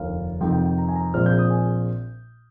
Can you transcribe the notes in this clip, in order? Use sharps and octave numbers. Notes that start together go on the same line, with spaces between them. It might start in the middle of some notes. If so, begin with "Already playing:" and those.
Already playing: F1 D#2 D3 F3 F5
F2 C3 D#3 G5
G5
G5
A#5
G#5
A#5
A#1 A#2 F3 G#3 C4 F6
G6
D#6
G#5